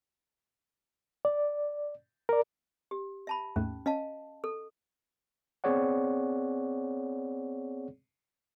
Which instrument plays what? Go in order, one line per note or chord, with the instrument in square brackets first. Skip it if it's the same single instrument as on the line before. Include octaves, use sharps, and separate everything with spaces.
[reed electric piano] D5
A#4 D5
[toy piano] G4
E5 A5 B5
[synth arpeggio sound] D#2 G#2 A3 [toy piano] C#4
[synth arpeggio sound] C#4 [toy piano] D#5 F5 A5
[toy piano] A4
[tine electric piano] B3 C4 G#4 C#5 D5 F#5